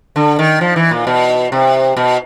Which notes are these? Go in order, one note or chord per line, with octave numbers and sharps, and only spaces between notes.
D3
D#3
F3
E3
A#2
B2
C3
B2